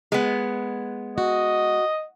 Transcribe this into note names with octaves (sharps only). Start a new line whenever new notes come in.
G#3 B3
F#4 D#5